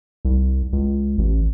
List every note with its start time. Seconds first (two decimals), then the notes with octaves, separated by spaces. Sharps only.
0.25 C2
0.73 C#2
1.18 A1